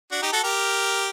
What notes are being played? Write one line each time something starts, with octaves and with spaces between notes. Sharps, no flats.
D4 F#4
D#4 G4
F#4 A4
G4 A#4